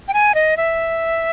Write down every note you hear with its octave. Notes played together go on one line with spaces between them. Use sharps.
G5
G#5
D#5
E5